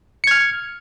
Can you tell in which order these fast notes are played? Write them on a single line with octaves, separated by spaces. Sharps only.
C#7 G#6 F6